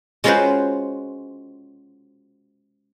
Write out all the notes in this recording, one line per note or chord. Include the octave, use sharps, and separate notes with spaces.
G#3 C#4 F4 F#4 B4 C5